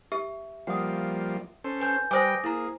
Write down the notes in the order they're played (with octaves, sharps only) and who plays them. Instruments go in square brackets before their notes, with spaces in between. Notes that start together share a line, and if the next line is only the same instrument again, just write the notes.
[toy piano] G4 [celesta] E5
[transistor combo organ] F3 G3 A#3 [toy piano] F#5 D#6
[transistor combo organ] C#4 A4 C5
[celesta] B4 G#5 G6
[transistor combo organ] G3 B4 G5 [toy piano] C5 G#5 [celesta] D6 D#6 A#6
[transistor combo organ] A#3 G#4 [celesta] E4 A#5